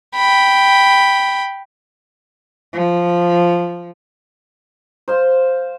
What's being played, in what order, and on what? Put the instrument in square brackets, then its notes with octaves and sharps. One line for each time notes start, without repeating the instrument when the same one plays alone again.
[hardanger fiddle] G5 B5
[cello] F3
[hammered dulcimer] C5 F5 C6